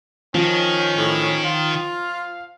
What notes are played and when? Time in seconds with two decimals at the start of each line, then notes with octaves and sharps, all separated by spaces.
0.35 D#3 F3 C#4
0.97 A2
1.45 F4 F5